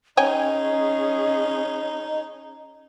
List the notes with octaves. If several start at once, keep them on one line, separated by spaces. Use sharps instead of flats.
C#4 D#4 G#4 C#5 D#5 G5 G#5